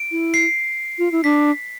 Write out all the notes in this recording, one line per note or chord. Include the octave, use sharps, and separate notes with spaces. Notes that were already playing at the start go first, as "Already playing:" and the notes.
Already playing: D7
E4
C7
F4
E4
D4 B6